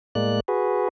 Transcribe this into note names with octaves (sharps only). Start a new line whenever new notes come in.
A2 G#3 A#3 D5 F#6
F#4 G#4 B4